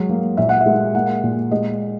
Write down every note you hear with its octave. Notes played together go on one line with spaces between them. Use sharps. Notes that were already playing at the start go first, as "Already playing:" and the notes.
Already playing: F#3 G#3
A#3
A#2 E5
F#5
E5
G#3
A#3 F#5
A#2
G#3 D#5